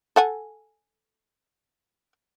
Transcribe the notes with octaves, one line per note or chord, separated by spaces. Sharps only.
A4 F#5 G#5